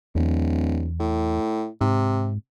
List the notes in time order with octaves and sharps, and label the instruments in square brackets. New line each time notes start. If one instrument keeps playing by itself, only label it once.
[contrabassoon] D1 [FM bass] E2
[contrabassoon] A2
[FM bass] G#2 [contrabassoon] C3